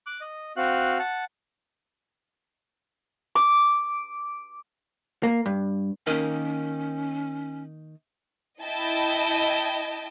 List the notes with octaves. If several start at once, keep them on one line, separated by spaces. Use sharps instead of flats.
D6 F#6
D#5
C4 F#4 F5 F#6
F#5 A5
D6
A#3
G2
D#3 A#3 C#4
E4 D#5 G5 A5